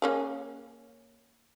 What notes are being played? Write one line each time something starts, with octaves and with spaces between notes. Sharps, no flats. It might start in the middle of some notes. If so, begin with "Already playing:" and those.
A#3 C#4 G#4